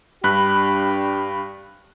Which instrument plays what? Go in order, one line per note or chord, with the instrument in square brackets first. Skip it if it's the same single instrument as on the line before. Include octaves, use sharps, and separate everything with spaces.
[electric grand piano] G2 B5 F#6 [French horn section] D4 G4